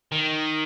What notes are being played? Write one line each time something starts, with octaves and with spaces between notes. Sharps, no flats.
D#3